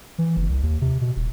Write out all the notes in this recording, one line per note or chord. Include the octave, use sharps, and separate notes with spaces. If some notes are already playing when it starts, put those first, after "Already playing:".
E3
F#1
C2
D#2
C3
B2
D#1